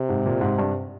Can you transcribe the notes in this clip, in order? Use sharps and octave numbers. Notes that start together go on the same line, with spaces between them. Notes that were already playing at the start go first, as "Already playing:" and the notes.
Already playing: C3
G#2
A#2
G#2
G2